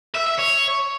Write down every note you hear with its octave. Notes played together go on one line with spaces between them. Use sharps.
E5
E5
C#5